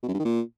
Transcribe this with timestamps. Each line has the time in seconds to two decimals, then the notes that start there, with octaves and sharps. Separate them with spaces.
0.03 B2
0.08 F#2
0.14 G2
0.19 D#3
0.25 A#2